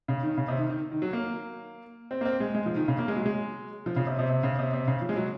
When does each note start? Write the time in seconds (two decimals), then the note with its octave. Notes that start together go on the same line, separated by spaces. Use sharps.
0.08 C#3
0.23 D#3
0.37 C#3
0.48 C3
0.59 D#3
0.70 D#3
0.92 D#3
1.02 F#3
1.13 A#3
2.11 C4
2.21 A#3
2.25 C4
2.40 G#3
2.55 G#3
2.66 F3
2.76 D#3
2.88 C#3
2.99 A#3
3.08 G#3
3.16 F#3
3.26 G#3
3.86 F3
3.96 C#3
4.07 C3
4.19 C3
4.29 C3
4.43 C#3
4.59 C3
4.73 C3
4.87 C#3
5.02 F3
5.09 G#3
5.16 F#3